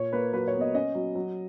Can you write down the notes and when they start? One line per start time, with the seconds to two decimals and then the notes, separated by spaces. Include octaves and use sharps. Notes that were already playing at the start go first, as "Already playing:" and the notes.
Already playing: A#2 C#5
0.13 A#3 B4
0.33 F#3 B4
0.48 C#5
0.55 B3
0.61 D#5
0.74 C#4 D#5
0.95 F#3
1.15 F#3